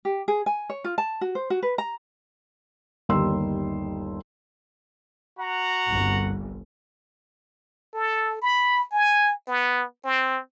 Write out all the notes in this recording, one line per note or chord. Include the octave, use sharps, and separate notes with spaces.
G4
G#4
G#5
C#5
F4
A5
F#4
C5
F#4
B4
A#5
G1 D#2 G3 D#4 C6 E6
F#4 F#5 A#5
G1 C2
A4
B5
G#5
B3
C4